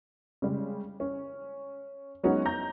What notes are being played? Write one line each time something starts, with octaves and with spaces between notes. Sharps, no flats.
C#3 G3 G#3
C#4
F#3 G#3 B3 C#4 D#4 F#4
A#5 G6 A#6